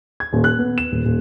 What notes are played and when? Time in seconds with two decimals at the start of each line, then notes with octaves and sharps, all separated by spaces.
0.20 G#6
0.33 D#1
0.44 F#6
0.59 B3
0.78 E7
0.92 D#1
1.05 D#1